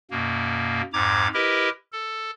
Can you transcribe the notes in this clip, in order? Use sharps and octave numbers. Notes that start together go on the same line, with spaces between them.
F#2 B2 A#3
F2 G#2 A#5 D6 G#6
E4 G4 A#4 B4 D#5
A4